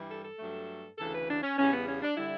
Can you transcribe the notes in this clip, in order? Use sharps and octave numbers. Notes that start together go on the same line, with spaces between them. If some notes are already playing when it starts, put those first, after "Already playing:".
Already playing: G2 E3 G3
A4
A4
G2 F#3 A3
D2 C#3 E3 A4
B4
D4
C#4
E2 C#3 G3 C#4
B3
C#4
D4
D3 G3 E4